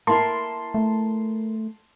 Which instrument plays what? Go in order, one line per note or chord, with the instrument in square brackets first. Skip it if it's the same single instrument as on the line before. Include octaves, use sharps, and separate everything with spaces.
[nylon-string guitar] A#3 E4 A#4 [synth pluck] A5 C6
[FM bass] A3